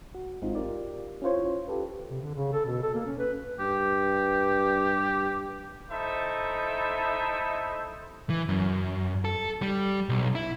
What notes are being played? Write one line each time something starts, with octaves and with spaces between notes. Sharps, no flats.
F#4
G#1 G#3 C4 D#4 F4
F4 G4 A#4 D5
C#4 E4 F4 C5 C#5
F4 G4 A4 B4
C3
D3
C#3
A4
B2
A4
A#3
C#4
B4
G2 G4
D#4 E4 A4 C5 E5
E3
F#2
A4
G3
B1
E4